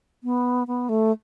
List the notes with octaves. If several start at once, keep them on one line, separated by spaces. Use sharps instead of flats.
B3
B3
A3